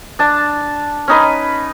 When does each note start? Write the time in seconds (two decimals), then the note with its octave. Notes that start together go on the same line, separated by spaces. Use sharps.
0.19 D4 A5
1.08 C#4 D#4 B4